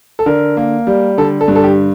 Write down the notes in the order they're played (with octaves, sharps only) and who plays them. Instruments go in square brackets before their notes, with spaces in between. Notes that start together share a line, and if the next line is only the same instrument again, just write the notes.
[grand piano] A4
D3 A#4
A#3
G3
D3 A4
A4
G2
A4
G4